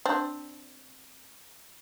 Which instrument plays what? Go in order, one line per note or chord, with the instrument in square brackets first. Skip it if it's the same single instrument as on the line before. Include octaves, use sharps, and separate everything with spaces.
[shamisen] C4 D4